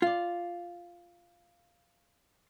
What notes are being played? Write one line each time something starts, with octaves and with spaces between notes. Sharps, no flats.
F4 D5